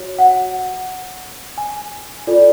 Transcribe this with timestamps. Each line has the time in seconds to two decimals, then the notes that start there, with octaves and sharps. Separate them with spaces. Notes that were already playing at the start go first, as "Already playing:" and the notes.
Already playing: F#4 C#5
0.19 F#5
1.58 G#5
2.27 F4 A4 D5